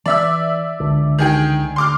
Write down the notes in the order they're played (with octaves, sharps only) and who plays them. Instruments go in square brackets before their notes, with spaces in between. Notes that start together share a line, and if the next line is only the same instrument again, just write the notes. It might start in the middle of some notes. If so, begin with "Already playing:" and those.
[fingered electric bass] E3 [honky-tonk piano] D5 E5 E6
[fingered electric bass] C#2 D3
[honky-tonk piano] D#3 G#4 G5
[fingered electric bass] D2
[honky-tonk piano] C6 D6 F6